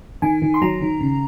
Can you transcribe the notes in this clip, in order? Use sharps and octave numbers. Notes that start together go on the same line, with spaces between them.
D#3 G#5
D#3
C6
F#3 A#5
D#3
C#3